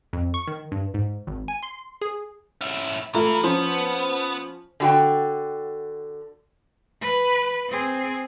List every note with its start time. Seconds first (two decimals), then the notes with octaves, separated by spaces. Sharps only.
0.13 F2
0.34 C#6
0.48 D#3
0.72 G2
0.94 G#2
1.27 G#1
1.48 G#5
1.63 C6
2.01 G#4
2.61 C#4 E4
3.15 E3 A3 F4 A#5
3.44 F3 B3 C#4 C5
4.80 D3 F#4 G5
7.01 B4
7.69 C4 G#4